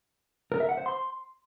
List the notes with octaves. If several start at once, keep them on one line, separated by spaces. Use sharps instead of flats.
A#4
E5
F#5
C5
C6